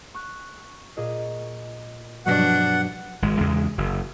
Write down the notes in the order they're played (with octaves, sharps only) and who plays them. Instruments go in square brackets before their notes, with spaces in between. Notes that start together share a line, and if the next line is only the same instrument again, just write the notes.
[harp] C#6 F#6
A#2 G#4 D#5
[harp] G2 B2 F#3 [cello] F3 D4 [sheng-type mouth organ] F#5
[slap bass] G#1 G#3
E2 C#3 G#3
F#1